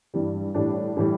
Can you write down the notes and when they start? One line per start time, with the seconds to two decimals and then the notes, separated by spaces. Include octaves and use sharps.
0.14 G2 E3 G3
0.54 A2 E3 G3 D4
0.97 A2 E3 G3